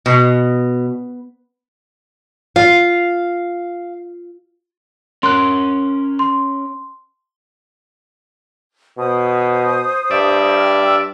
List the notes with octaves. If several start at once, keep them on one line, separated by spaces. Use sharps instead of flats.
B2
F4 F5
C#4 A#4 C6 F#6
C6
B2 C5 D#6
G2 D5 E5
G5 E6 F6